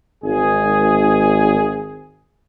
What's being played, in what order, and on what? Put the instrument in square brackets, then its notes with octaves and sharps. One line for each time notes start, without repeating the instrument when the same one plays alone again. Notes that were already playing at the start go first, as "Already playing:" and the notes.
[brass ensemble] G#1 G#4